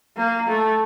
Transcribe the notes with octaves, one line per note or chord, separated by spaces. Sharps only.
A#3
A3